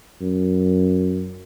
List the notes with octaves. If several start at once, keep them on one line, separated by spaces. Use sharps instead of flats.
F#2